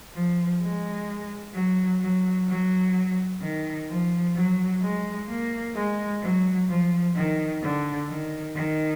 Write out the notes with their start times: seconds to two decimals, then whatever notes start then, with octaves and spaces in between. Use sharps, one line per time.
0.14 F3
0.61 G#3
1.54 F#3
2.01 F#3
2.48 F#3
3.41 D#3
3.89 F3
4.35 F#3
4.82 G#3
5.28 A#3
5.74 G#3
6.22 F#3
6.68 F3
7.15 D#3
7.62 D3
8.08 D#3
8.55 D#3